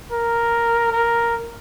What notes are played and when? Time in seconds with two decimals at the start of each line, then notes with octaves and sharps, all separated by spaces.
0.12 A#4
0.92 A#4